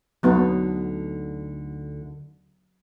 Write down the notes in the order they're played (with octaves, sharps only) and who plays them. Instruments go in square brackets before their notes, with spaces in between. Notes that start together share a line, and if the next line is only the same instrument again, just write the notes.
[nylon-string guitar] D2 D3 D#4 [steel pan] F#3 B3